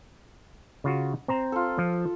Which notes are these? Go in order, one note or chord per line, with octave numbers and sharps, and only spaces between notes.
C#3 F4 F#4
C4 C5 A#5
F4 A4
F3